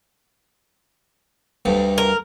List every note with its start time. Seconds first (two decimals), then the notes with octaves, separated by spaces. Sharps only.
1.65 D2 G2
1.98 A#4